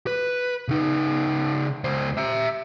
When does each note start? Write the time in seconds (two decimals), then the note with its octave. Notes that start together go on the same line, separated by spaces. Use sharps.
0.07 B4
0.68 C#3 D#4
1.84 C#2 C5
2.18 E5 A#5